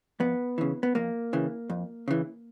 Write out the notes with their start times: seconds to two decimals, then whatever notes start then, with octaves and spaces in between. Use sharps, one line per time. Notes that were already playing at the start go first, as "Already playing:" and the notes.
0.20 F2 B3
0.58 C#3 E3
0.83 B3
0.95 F2 A#3
1.33 C#3 E3
1.70 F2
2.08 C#3 E3